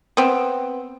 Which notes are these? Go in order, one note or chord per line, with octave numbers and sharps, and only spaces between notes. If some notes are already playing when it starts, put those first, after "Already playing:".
B3 C4